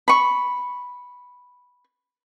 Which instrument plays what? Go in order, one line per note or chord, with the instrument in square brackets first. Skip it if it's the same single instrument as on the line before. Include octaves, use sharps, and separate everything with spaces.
[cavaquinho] B5 C#6